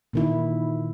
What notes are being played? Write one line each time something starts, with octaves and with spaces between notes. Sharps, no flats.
A#2 D#3 E4